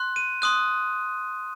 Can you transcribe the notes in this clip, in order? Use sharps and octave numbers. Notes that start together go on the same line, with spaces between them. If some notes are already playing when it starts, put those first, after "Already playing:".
Already playing: C6 F#6
D#7
C6 D#6 F#6